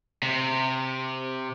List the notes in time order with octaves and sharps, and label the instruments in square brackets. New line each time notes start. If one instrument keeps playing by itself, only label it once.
[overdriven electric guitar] C3